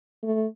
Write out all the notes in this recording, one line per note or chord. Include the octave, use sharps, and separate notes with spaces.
A3